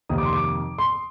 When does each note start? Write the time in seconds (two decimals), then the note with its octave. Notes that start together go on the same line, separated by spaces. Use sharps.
0.09 F2 C3 D#3 A#3 D#6
0.18 D6
0.25 C6
0.33 D6
0.78 C6